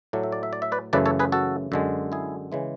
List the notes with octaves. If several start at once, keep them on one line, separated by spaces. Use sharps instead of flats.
A2 F#3 A3 D5
E5
D5
E5
D5
E5
B4 D5
F#2 C#3 E3 A3 B4 D5
A4 C#5
G#4 B4
F#4 A4
F#2 D3 G#3
E4 G#4
C#3 E3 G#3